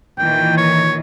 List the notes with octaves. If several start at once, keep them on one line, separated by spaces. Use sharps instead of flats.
A#2 D#3 E3 G5
C#5